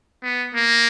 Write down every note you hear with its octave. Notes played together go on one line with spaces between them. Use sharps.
B3
A#3